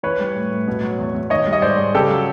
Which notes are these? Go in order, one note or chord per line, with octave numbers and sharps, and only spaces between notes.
E3 B4 C#5
G3
A2
A2
B2
F#3
E2
E2
D#3 C#5 D#5
G3
D#5
G#2 C5 D5
G#2
C#3 G4 A4
F#3